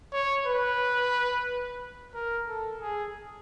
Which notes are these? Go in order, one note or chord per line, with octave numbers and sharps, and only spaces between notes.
C#5
B4
A#4
A4
G#4